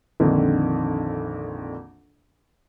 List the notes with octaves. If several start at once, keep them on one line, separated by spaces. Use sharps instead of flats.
A#1 F2 D3 D#3